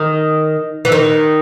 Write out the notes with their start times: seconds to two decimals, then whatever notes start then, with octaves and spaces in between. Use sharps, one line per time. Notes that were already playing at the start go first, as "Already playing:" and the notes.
Already playing: D#3
0.85 E3
0.92 D#3